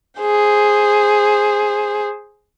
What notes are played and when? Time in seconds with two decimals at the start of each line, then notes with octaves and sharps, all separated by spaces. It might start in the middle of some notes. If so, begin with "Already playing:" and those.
0.21 G#4 C5